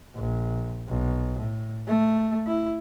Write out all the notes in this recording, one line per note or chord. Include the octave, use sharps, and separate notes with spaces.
A#1
B1
A2
A3
E4